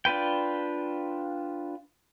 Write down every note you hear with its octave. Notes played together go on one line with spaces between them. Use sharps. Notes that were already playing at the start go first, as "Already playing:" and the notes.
D4 F4 B4 G5